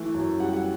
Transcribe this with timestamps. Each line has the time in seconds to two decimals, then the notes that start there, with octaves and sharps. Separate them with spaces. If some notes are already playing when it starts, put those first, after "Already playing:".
Already playing: E3 A3
0.14 F#2
0.40 G3 F#5
0.53 F#5